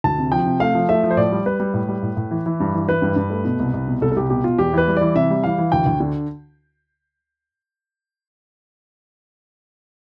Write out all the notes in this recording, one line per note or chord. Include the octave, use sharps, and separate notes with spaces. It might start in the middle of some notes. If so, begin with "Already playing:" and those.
D2 A5
C3
F3 G5
C3
A3 F5
F3
A3 E5
F3
C5
A2 D5
G3
G3 B4
G3
A2
G3
A2
A2
E3
E3
G2
E3
E3 B4
G2
G2
A3
B2
C2
C2
B2
C2 A4
A4
C2 G4
B2 G4
B2 F4
E2 G4
E3 B4
G3
E3 D5
C3 E5
G3
E3 F5
E3
D2 G5
D2
D3